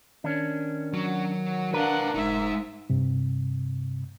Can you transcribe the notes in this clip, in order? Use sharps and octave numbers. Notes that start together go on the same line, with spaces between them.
D#3 C#4 D4
F#3 F#4
D4 A#4 B4 F5 F#5
F1 G#3 D#4 E5
G2 C3